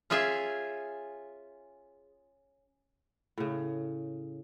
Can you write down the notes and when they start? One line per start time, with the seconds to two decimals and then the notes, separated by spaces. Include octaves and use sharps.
0.10 C#4 F4 G#4 E5 G#5
3.38 A2 C#3